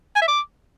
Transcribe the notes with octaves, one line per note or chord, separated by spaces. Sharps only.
G#5
E5
D6